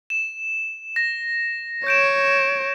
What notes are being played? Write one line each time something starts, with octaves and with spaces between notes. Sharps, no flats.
E7
A#6
C#5 G6 D7 E7